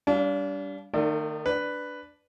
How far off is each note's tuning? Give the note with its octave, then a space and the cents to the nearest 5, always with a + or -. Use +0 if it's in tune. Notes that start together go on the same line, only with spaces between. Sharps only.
G3 +0 D4 -35 F5 +0
D#3 -30 A3 +35 D5 +10
D4 +0 B4 +5